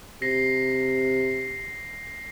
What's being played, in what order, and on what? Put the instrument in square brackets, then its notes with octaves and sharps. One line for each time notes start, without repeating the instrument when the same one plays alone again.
[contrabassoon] C3 [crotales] A#6 C7